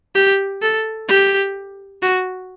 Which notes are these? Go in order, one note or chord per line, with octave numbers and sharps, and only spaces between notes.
G4
A4
G4
F#4